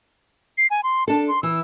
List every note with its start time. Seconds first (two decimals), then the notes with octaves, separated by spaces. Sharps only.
0.58 C7
0.70 G#5
0.83 C6
1.08 D4 A4 A5
1.28 C6
1.43 E3 E6